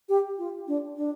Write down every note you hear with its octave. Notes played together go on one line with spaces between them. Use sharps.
G4
F4
D4
D4